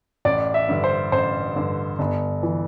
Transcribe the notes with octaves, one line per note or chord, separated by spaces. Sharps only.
A1 D5
E5
G2 D3
C5
A1 C5
G2 D3
G1
E3